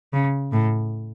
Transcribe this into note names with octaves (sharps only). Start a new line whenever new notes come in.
C#3
A2